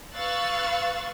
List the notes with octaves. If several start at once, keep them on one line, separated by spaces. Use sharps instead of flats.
B4 F5 C#6 E6 F#6 A6